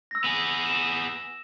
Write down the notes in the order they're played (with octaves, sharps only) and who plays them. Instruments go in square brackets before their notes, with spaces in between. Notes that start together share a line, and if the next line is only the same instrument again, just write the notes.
[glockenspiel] E6 A#6
[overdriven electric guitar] B3 G#4
[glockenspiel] E7